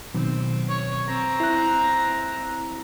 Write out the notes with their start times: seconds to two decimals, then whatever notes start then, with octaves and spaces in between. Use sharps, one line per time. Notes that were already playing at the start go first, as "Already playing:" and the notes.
0.14 B2 D#3 F#3 C4
0.69 C#5
1.08 C4 A#5
1.40 E4 F#6